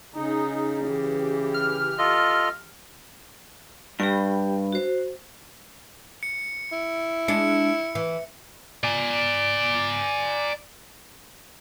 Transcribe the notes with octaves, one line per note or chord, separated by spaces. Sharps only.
C#3 D#4 G#4
E3 G4
F6
F4 A4 D#5
G2 G4 G5
F#4 C5
C#7
E4
G#3 D4 C#7
E3
D5 G#5